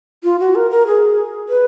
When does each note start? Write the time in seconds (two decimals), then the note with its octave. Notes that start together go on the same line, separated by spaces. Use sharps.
0.24 F4
0.40 F#4
0.55 A#4
0.71 A#4
0.87 G#4
1.49 B4